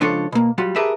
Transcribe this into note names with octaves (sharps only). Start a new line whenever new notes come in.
C#2 F3 D4 F4 A4 C#5
B2 A#3
F#3 G3 F4 F#4
G4 G#4 A#4 B4 E5 A5